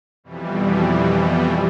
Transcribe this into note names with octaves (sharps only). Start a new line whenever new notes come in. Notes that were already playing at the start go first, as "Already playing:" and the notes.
F2 B2 E3 G3